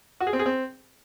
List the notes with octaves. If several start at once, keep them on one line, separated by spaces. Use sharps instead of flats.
F#4
G#4
C4
G#4
C4